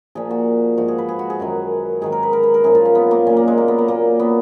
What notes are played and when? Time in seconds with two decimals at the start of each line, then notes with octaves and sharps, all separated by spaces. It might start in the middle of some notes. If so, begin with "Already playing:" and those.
0.15 A#2 F3 G#4
0.30 F#4
0.78 G#2 F3 F#4
0.88 G#4
0.98 B4
1.09 G#4
1.19 F#4
1.30 G#4
1.40 F#2 D#3 F#3
2.01 G#2 D#3 F#3 G#4
2.12 A#4
2.23 B4
2.33 A#4
2.43 B4
2.54 A#4
2.64 F#2 F3 G#4
2.75 F4
2.85 C#4
2.95 B3
3.11 A#3
3.26 A#2 F#3 C#4
3.37 A#3
3.48 G#3
3.58 A#3
3.68 B3
3.78 A#3
3.88 A#2 F#3 A#3
4.19 B3